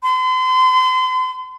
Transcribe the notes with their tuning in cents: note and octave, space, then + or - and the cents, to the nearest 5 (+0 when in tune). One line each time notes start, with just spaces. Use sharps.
C6 -40